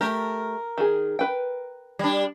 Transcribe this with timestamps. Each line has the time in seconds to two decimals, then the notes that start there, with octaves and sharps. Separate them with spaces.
0.01 A3 G4 A#4
0.78 D#3 G#4
1.19 B4 G5
1.99 G3 D4